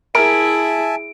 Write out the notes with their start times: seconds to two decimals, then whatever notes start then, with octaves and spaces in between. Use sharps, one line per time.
0.15 E4 G#4 A#4 E5 G#5 A5 D7